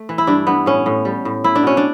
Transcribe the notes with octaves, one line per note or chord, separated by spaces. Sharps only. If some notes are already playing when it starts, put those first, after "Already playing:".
Already playing: A3
E3
E4
G2 D4
G2 B3
A2 C#4
A2
G3
A2
A3 E4
D4
B2 C#4
D4